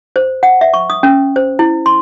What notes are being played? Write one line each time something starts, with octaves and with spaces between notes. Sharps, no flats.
C5
F#5
E5
C#6
D#6
C#4
C5
E4
C6